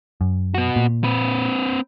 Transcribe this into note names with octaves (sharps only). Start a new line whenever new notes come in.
F#2
B3 F#4
A#2
C4 B4